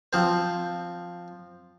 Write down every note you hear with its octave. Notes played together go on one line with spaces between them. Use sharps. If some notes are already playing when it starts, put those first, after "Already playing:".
F3 C4 C5